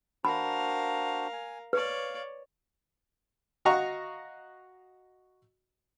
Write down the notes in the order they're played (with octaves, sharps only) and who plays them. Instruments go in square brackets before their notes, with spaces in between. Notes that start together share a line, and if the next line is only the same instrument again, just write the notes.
[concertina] D4 F#4 C5 [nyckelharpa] A#4 F5 [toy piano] B5
[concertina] G#5
[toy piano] B4 [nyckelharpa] C#5 D5 [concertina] F5
[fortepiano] F#4 D#5 F5 F#5 A#5 C#6